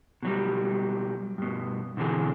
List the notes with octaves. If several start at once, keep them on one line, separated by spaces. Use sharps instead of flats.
B2 F#3 G3
G2 B2
B2 D3 E3 C4 G#4